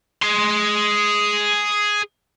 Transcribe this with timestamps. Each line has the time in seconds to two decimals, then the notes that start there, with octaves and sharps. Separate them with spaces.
0.22 G#4 C6